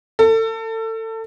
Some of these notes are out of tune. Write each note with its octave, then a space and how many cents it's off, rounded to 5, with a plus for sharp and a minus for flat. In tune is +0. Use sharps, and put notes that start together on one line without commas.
A4 +30